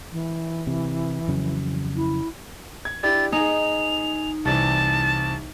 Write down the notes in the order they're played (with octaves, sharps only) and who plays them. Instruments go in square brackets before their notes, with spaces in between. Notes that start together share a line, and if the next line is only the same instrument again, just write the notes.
[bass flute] E3
[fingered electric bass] C3
F2 C#3 F#3
[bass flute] E4
[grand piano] G#6
[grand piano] D4 E4 G4 [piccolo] A6
[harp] D#4 [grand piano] G#4 G#5 [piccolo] F7
[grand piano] C2 C3 E3 [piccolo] A5